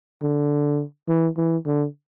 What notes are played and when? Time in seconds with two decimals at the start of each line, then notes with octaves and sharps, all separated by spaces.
0.23 D3
1.08 E3
1.37 E3
1.66 D3